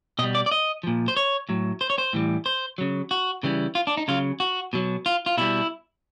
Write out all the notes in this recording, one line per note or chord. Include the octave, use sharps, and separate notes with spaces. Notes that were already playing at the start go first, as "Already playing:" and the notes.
B2 G3 D#5
D5
D5
D#5
A#2 F3
C5
C#5
A2 F#3
C5
C#5
C5
A2 E3 G3
C5
C#3 F#3
F#4
C#3 E3 G3
F4
D4
D#4
C#3 F#3 F4
F#4
B2 F#3
F4
F4
B2 G3 E4